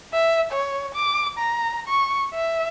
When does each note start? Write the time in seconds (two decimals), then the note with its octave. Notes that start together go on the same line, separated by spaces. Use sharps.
0.13 E5
0.51 C#5
0.95 D6
1.38 A#5
1.88 C#6
2.34 E5